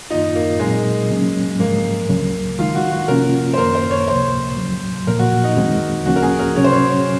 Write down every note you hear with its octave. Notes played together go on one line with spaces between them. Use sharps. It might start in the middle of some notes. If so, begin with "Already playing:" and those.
F#2 D#3 A#3 D#4 F4
A#3
A#2 F#3 G#3 C4
F2 C#3 F#3 A#3 C#4
G#2 F3 G#3 A#3
C#2 C#3 F#3
D#3 G#3 D#4 F4
F#4
F#4
C3 F3 A#3 C#4 F4 A#4
C5
F#2 D#3 A#3 A#4
C5
C#5
C#2 C3 F3 A#3 C5
D#2 C#3 F#3
A#2 F3 A#3 A#4
F#4
D#4
D#2 D#3 G#3 C4
C#2 C#3 F3 A#3 C#4 F#4
A#4
G#4
A#4
C3 F#3 C#4 G#4 C#5
C5
C#5